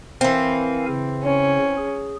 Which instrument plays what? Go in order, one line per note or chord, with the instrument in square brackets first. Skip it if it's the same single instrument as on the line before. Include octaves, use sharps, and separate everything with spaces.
[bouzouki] E3 C4 [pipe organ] A#4 F5 G#5
[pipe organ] C#3
[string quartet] C#4
[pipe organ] G#4